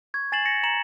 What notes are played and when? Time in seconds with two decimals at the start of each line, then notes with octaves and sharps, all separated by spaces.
0.14 C#6 G#6
0.32 G#5 A6 C7 E7 F#7
0.46 A#6 C#7
0.63 A#5 C#7 E7 F#7